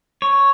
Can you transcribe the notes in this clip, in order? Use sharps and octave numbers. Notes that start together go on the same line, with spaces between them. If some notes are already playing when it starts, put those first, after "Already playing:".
C#5